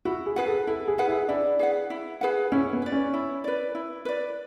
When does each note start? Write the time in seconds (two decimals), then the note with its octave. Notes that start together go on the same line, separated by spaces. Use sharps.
0.05 E4 F#4
0.26 G#4
0.36 G#4 B4 F#5
0.46 A4
0.67 E4 A4
0.88 G#4
0.98 G#4 B4 F#5
1.08 E4
1.28 D4 E4
1.59 G#4 B4 F#5
1.90 E4
2.21 G#4 B4 F#5
2.52 C#4 E4
2.73 B3
2.82 B4 D5
2.92 C#4
3.14 E4
3.44 B4 D5
3.75 E4
4.05 B4 D5